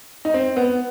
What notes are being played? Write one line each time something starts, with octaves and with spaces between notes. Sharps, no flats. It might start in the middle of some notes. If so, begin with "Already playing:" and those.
D#4
C4
B3